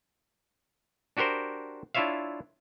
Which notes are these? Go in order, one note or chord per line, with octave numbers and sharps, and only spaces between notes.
D4 F#4 G4 A#4 C5
D4 E4 F4 C#5 E5 F5